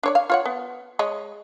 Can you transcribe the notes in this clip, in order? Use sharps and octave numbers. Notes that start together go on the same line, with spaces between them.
D4 C#5 D5
F5
F4 C#5 F#5
B3
G#3 C#5 D#5